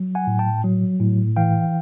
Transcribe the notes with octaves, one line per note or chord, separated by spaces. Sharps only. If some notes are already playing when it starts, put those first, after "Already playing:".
Already playing: F#3
F#5 G#5
A2
G5 A5
F#3
A2
E3 F5 G5